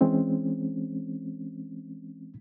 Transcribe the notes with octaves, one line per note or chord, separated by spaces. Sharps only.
E3 G#3 C4 C#4